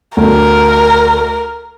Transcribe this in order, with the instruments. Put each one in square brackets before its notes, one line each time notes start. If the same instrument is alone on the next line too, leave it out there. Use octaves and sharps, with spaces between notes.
[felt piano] D2 [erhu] A#4